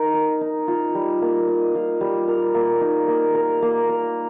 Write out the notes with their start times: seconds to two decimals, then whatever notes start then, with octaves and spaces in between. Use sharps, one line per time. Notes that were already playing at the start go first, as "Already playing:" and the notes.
Already playing: D#4 A#4
0.14 D#5
0.41 D#4
0.68 F4
0.95 G3
1.22 A#3
1.48 D#5
1.75 F4
2.01 G3
2.28 A#4
2.54 A#3
2.81 D#4
3.08 A#3
3.34 A#4
3.62 A#3
3.89 A#4